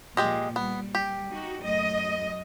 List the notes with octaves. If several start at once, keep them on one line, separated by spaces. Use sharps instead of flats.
A#2 F3 G#3 G4 D#5
G3 B3
G4
D#4 F#4
F#2 A3 D#5